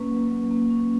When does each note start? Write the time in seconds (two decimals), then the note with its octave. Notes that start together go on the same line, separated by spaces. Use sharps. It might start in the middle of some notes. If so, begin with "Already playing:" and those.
Already playing: A#3 C#4 B4
0.11 F#3
0.30 F#3
0.51 A#3
0.70 C#4